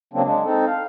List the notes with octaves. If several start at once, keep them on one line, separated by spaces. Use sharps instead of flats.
C#3 F#3 A#3 C4 D4
G#3 D4
C4 D#4 A4
F5